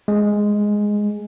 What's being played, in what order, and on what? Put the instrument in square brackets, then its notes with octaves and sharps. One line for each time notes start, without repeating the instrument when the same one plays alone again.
[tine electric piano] G#3